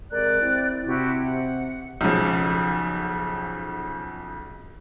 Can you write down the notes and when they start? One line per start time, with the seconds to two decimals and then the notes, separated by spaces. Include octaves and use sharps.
0.11 C3 G#3 A#4 D5 F#6
0.42 C4 E4
0.86 C3 E4 F#4 G4
1.20 F#5
2.01 B1 C#3 F3